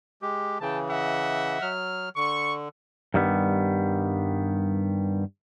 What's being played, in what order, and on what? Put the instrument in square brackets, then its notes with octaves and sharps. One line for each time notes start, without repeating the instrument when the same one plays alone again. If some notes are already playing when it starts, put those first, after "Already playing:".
[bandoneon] G#3 G4
[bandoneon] C#3 E3 [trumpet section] G#4 G5 A5
[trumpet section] D#5 E5 F#5
[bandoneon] F#3 F6
[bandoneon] D3 [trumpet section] C#6
[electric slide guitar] G2 D#3 G3 B3